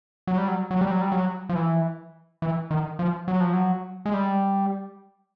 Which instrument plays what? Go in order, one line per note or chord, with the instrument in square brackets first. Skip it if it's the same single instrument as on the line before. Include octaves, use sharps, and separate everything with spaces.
[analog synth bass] F#3
G3
F#3
F#3
G3
F#3
G3
F#3
F3
E3
E3
D#3
F3
F#3
F3
F#3
G#3
G3